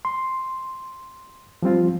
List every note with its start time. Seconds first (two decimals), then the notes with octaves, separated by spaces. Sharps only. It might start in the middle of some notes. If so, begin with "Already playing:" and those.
0.05 C6
1.63 F3 G3 C4 F4